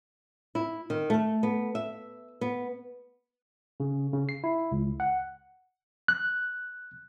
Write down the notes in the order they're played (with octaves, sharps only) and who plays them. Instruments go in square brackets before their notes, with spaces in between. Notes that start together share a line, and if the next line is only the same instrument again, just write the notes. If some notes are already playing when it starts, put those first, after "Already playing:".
[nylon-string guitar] E4
D#3
A3
B3
E5
B3
[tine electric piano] C#3
C#3
C7
E4
C#2
F#5
[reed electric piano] F#6